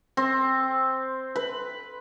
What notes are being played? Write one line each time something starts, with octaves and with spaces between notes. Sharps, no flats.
C4
B4